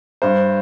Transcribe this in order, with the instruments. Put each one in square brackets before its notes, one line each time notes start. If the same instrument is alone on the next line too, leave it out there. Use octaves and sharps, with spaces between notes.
[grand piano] G2 C5